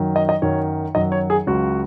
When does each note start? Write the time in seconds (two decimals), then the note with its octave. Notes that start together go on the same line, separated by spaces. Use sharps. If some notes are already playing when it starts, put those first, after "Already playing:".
Already playing: F#2 D#3 F#3
0.16 D#5
0.29 D#5
0.42 F#2 D#3 F#3 C#5
0.95 F#2 D#3 F#3 D#5
1.12 C#5
1.30 G#4
1.47 C#2 C#3 F#3 F#4